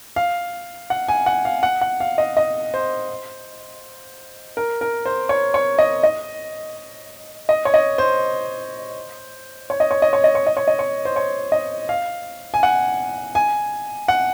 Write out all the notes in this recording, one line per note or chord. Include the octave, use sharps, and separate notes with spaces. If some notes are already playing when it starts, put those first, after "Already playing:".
F5
F#5
G#5
F#5
F5
F#5
F#5
F5
D#5
D#5
C5
A#4
A#4
C5
C#5
C#5
D#5
D#5
D#5
C#5
D#5
C5
C#5
D#5
C#5
D#5
C#5
D#5
C#5
D#5
C#5
D#5
C#5
C5
C#5
D#5
F5
G#5
F#5
G#5
F#5